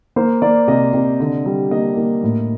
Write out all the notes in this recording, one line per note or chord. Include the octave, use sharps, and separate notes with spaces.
A#3 C5
A#3 D5
C3 D#5
C3
D3
G3
A#3 D#5
A#3
A2